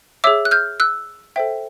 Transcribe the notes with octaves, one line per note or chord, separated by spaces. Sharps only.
G#4 C#5 E5 D6 E6
F#6
F6 G6
E6 F#6
A4 C5 E5 G5